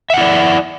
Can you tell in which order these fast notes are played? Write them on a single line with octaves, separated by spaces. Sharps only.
E5 F#5 E4 D5